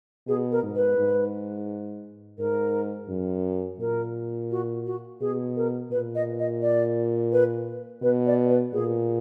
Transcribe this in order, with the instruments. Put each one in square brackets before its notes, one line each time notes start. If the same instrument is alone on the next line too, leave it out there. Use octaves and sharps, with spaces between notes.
[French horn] B2 [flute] G#4
[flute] A#4
[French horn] G#2
[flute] B4
[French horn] G#2
[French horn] G#2 [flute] A#4
[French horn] F#2
[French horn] A#2 [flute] A#4
[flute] F#4
F#4
[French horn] B2 [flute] G#4
[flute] A#4
[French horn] A#2 [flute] B4
[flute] D#5
D#5
D5
B4
[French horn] B2 [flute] B4
[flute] D5
B4
[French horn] A#2 [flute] G#4